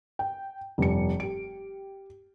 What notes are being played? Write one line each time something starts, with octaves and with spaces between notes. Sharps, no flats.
G5
F1 G2 C#7
G4 D7